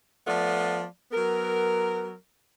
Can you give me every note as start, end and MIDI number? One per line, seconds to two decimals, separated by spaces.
0.27 0.84 53
0.27 0.84 57
0.27 0.84 59
0.27 0.84 65
0.27 0.84 74
1.12 2.13 54
1.12 2.13 59
1.12 2.13 70